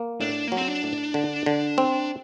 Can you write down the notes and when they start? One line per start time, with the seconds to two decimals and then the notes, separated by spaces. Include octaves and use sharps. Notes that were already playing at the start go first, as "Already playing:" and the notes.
Already playing: A#3
0.21 A2 D4
0.47 F#3 A#3
0.57 C4
0.68 D4
0.83 A2
1.14 D3
1.46 D3
1.78 C4